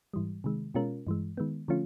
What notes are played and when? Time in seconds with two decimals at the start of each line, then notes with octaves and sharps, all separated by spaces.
0.13 G#2 E3 G3
0.44 C3 D#3 G#3
0.74 B2 G#3 C#4 F4 A#4
1.07 G2 E3 G#3
1.37 D#3 G#3 B3
1.68 D3 F3 A3 C#4 F4